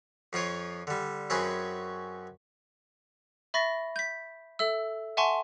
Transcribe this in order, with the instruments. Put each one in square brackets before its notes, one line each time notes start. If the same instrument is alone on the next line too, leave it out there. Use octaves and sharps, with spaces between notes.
[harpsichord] F2 F3 F4 C#5
D3 G3
F#2 C4 C#4 F#4 G#4 B4
[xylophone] E5 B5 C#6 A6 A#6
G6 B6
A4 E5 E6
E5 F#5 G#5 A5 C6 C#6